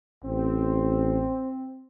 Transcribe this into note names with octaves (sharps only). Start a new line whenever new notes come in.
A1 C4